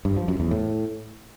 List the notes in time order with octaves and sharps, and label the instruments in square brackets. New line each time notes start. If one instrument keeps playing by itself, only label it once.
[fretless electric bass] G2
F3
F#2
E2
A2